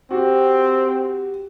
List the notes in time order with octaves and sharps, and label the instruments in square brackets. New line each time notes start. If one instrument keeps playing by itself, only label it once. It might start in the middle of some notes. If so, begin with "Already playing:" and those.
[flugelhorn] C4 [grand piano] F#4 G4